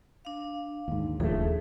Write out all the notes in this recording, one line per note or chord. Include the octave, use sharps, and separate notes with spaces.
D4 F5
D#2 G#2
D#1 F3 G3 A3 G#4